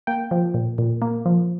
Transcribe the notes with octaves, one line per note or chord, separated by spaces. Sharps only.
A#3 G5
F3
A#2
A#2
A#3
F3